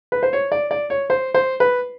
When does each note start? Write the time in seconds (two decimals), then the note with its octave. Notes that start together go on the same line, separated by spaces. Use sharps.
0.12 B4
0.23 C5
0.33 C#5
0.52 D5
0.71 D5
0.90 C#5
1.10 C5
1.34 C5
1.60 B4